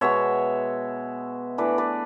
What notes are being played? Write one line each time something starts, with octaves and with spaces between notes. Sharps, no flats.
B2 G#3 B3 C#5 E5
E3 A3 D4 B4 D5
B4 D5